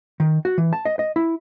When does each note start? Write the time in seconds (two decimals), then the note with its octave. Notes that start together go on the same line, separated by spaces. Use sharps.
0.20 D#3
0.45 F#4
0.58 E3
0.73 A5
0.85 D#5
0.99 D#5
1.16 E4